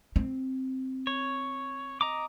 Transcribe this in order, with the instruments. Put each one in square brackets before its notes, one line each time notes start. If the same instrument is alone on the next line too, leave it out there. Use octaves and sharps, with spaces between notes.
[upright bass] C4
[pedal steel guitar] C#5
D#5 A#5 D6